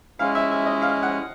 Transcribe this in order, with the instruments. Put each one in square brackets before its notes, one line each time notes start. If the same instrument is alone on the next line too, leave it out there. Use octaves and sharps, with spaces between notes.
[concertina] G#3 C#4 E4 [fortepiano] F5
[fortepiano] E5
E5
D#5
F5
F#5